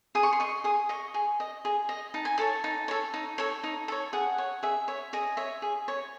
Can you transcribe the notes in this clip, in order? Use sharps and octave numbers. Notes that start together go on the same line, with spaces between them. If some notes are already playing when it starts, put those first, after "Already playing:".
G#4 D#6
C#6
C6
D#5 C#6
G#4 D#6
D#5 C#6
G#4
D#5
G#4
D#5
D#4 A5
G#5
A4 C#5 A5
D#4
A4 C#5
D#4
A4 C#5
D#4
A4 C#5
G#4 F#5
C#5
G#4 E5
C#5 E5
G#4 D#5
C#5 E5
G#4
C#5